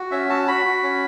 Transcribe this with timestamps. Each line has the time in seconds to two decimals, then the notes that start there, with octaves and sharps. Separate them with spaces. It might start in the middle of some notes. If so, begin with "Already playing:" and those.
Already playing: F#4
0.11 C#4 E5
0.29 F#4 A5
0.48 F#4 B5
0.65 F#4
0.83 C#4